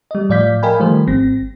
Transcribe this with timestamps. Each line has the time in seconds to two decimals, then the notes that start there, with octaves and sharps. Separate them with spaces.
0.11 G3 D#5
0.29 A2 F3 D5 F5 G6 B6
0.63 A#4 D#5 F5 G5 G#5 B5
0.80 D#3 F3 G3 A3 C5
1.07 G#1 C4 A#6